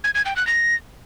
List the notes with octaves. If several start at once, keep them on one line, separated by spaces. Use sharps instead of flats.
G#6
G#6
G5
F#6
A#6